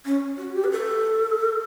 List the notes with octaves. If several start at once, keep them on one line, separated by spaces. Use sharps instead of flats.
C#4
F#4
G4
B4
A4